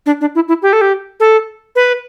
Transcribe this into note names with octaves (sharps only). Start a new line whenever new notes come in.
D4
D4
E4
E4
G4
A4
G4
A4
B4